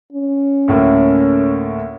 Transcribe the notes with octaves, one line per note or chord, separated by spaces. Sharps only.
C#4
D2 A2 A#3